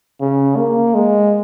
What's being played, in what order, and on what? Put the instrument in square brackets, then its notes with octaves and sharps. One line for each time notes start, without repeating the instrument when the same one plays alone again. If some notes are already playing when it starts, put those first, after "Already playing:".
[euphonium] C#3
A#3
G#3